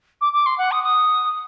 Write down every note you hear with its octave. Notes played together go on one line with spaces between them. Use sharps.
D6
D6
C6
F#5
D#6
D#6